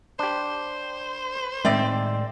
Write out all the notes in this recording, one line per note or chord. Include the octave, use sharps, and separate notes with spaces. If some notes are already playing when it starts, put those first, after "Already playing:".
D4 G4 C5
A2 D#3 G#3 C4 D5 E5